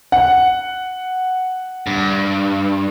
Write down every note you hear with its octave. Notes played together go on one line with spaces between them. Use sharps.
F#5
G2